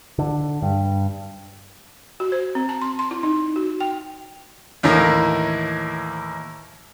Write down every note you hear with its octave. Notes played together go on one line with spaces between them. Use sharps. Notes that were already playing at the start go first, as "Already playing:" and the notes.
D3
G2
F#4
C5
C4
A5
C6
C6
E4
D#4
F#4
G5
D#2 A2 E3 A#3